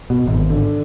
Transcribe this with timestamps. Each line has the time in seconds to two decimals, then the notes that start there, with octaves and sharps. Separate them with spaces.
0.10 B2
0.27 G#1
0.50 D3